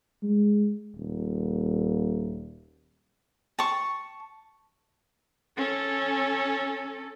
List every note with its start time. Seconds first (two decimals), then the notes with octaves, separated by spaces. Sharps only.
0.23 G#3
0.95 D#1
3.59 A5 C#6
5.57 C#4 A4